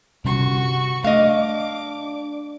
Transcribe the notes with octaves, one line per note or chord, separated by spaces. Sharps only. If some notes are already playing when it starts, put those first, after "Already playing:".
G1 C3 G3 C#4 F#4 C#6
A3 D4 D#5 F5 D6